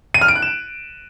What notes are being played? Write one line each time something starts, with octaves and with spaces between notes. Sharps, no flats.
D#7
F6
D7
F#6
E7